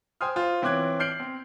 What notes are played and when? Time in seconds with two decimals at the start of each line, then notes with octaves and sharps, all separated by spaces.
0.21 C5 G5 G#5 C6 D#6 F6
0.36 F4 C5
0.62 E3 C4 C#5 D6 F#6 G#6
1.00 F6 G6 C7 D7 F#7
1.20 C4